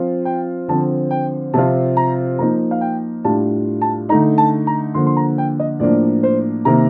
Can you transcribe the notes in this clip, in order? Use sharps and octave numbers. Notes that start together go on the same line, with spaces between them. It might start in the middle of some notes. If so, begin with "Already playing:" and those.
Already playing: F3 C4 F4
G5
D3 F3 C4 A5
G5
C3 F3 C4 F4 A5
A#5
F3 A#3 D#4 A#5
F5
G5
A2 G3 D4 F4 A5
A5
D3 A3 D#4 A#5
A5
A#5
D3 F3 A#3 C6
C6
A#5
G5
D#5
A2 F3 A#3 D4 D5
C5
C3 D#3 A#3 A#5